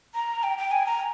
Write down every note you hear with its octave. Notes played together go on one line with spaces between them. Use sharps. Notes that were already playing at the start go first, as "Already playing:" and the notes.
A#5
G5
G5
G#5
A#5